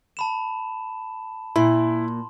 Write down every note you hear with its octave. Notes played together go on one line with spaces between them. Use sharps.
A5 B5 E7
A#2 E4 C6